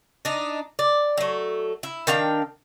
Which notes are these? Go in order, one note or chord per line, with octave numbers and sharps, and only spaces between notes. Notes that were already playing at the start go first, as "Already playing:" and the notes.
D4 D#4
D5
F#3 A3
E4
D#3 D4 F5 G5